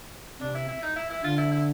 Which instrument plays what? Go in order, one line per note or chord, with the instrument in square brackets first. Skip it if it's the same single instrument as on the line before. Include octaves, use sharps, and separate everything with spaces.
[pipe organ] C3 [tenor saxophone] D4
[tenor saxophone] E4
E4
D#4
E4
E4
[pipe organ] D3 [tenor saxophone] F4
[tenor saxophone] E4
E4